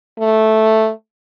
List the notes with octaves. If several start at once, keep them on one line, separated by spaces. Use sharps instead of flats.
A3